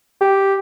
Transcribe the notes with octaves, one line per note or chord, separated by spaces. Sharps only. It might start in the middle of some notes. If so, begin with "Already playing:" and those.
G4